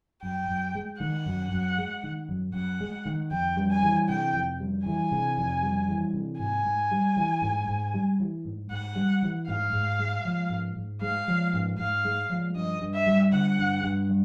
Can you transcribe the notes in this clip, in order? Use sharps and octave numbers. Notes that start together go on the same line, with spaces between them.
F#2 G5
F#2
G#3
D#3 F#5
F#2
F#2
G#3
D#3
F#2
F#2 F#5
G#3
D#3
F2 G5
G3
G#5
E3
C3 G5
F2
G3
E3 G#5
C3
F2
G3
E3
C3
G#2 G#5
G#2
G3
E3
G#2
G#2
G3
E3
G#2
G#2 F#5
G3
E3
G#2 F5
G#2
G#3
F3
G#2
G#2
G#3 F5
F3
G#2
G#2 F5
G#3
F3
G2 D#5
G2
E5
G3
D3 F#5
G2
G2
G3